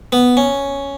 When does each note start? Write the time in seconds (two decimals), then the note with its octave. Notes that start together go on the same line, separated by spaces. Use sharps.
0.12 B3
0.37 C#4